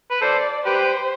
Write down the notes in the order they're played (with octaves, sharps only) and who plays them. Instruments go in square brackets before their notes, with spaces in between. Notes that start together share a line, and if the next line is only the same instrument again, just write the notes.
[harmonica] B4
[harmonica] A4 C5 [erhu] D5
[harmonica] G4 B4 [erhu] C5